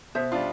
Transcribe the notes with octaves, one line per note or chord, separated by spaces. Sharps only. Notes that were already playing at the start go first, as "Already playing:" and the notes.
B2 C5 E5
G3 D4 F4